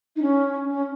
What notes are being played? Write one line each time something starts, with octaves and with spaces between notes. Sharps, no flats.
D#4
C#4
C#4